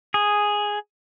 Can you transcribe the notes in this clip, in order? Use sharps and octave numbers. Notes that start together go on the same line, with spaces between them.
G#4